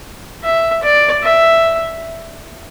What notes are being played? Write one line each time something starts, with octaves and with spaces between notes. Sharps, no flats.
E5
D5
E5